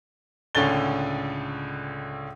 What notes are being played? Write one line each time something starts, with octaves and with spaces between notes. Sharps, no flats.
C#2 A2 D3 C#4 A6 G7